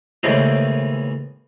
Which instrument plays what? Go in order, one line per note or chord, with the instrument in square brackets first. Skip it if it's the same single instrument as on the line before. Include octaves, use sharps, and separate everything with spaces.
[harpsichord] D#2 A2 C#3 E3 G#3 C4